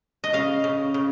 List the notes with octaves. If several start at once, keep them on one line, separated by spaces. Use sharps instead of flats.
D#5
C#3 F5
C#3
C#3